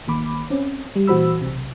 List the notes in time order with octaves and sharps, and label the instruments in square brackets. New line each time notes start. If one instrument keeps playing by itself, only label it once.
[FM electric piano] A1 D#3 A#3 B5 D6
C4 C#4
G3
A#2 E3 F#4 C5 B5 E6
B1 C3